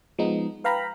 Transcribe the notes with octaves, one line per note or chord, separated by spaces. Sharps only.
F3 G#3 B3 D#4
B4 F5 G5 A#5 B5